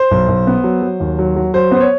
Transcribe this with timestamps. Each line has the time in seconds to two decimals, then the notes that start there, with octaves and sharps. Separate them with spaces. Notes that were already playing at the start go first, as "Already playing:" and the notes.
Already playing: C5
0.11 B1
0.28 B1
0.47 B3
0.64 F#3
0.82 F#3
1.00 D#2
1.19 F#3
1.36 F#3
1.54 F#3 C5
1.71 B3 C5
1.80 C#5